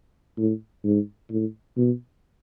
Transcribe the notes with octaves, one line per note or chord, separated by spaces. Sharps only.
A2
G#2
A2
B2